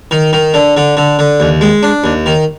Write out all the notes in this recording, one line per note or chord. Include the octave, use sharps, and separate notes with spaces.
D#3
D#3
D3
D3
D3
D3
D#2
G#3
D4
D#2
D#3